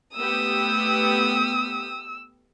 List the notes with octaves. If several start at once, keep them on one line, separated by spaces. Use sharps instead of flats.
A3 B3 G4 D#6 E6